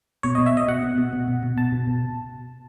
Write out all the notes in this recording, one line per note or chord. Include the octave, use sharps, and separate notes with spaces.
B2 C#5
D#5
B2
E5
B2 D#5
B2 F#5
B2
B2
B2
B2
B2
B2 A5
B2
B2